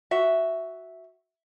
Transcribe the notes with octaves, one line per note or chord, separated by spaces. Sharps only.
F#4 E5